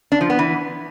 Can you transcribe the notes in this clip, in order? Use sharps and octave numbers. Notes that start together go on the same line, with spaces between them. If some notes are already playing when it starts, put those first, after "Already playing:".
D4
F3
B3
E3